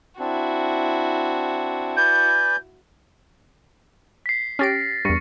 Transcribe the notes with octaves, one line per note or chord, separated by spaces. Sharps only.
C4 D4 E4 F#4
B4 D5 G#5 G6
B6 C7
C#4 G4 F6 A6 A#6 D7
E2 G2 C#6 A#6 C#7